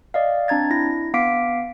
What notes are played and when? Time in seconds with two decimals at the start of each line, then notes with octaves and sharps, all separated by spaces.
0.14 D5 D#5 F5
0.48 C4 D4 A#5 G#6 A6
0.71 E4 A#6
1.14 B3 F5 D6 B6 D7